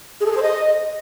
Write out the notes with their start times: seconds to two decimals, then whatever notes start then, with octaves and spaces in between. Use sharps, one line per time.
0.21 G#4
0.26 A4
0.32 G#4
0.37 C5
0.43 D#5